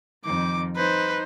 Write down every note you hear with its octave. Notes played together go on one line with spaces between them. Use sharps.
F2 D#3 D6
D#4 B4 C5